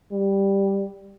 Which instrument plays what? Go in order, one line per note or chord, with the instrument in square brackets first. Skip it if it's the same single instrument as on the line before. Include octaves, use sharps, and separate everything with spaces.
[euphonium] G3